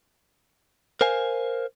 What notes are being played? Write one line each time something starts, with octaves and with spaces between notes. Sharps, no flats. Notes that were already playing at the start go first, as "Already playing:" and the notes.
A#4 C5 F5 G#5